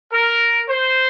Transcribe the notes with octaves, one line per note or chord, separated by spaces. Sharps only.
A#4
C5